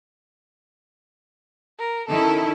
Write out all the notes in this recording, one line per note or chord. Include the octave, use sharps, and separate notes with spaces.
A#4
D#3 C#4 E4 A4